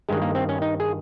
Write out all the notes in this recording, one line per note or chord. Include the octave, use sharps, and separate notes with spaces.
G2 D#3 G#3
A#3
C4
C#4
D#4
G#4